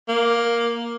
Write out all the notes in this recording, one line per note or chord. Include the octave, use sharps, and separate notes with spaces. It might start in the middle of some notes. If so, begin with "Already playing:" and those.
A#3